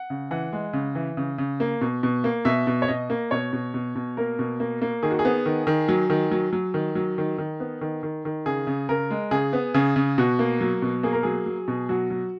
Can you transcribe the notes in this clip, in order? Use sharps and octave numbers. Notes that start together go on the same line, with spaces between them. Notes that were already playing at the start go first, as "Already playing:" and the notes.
Already playing: F#5
C#3
E3 F#5
G#3
C#3
E3
C#3
C#3
A#3
B2
B2
A#3
B2 E5
B2
C#5
B2 D#5
A#3
B2 C#5
B2
B2
B2
A#3 A#4
B2
A#3
A#3
D#3 G#4
F#4
G#4
B3
D#3
D#3
F#3
D#3
F#3
F#3
D#3
F#3
D#3
D#3
B3
D#3
D#3
D#3
C#3 G#4
C#3
C#3 A#4
G#3
C#3 G#4
B3
C#3 G#4
C#3
B2 F#4
A#3
F#3
B2
A#3 G#4
A#4
F#3 G#4
F#3
B2
F#3 F#4
F#3